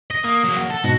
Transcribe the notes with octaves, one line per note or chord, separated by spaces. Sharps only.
D#5
A#3 D#6
F#3 A#3
F#5
A4
G#2 B2 F#4